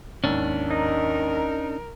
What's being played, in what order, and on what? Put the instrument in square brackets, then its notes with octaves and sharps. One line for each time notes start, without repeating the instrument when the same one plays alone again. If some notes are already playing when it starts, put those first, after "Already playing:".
[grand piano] D#2 G#2 [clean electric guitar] C#4 D4
[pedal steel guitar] D#4 [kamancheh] A#4